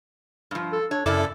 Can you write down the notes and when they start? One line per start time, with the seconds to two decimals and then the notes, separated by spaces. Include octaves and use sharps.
0.51 G2 F3
0.72 A4
0.91 D4 C#5
1.06 F#2 C#3 E4 A4 D5 A5 D6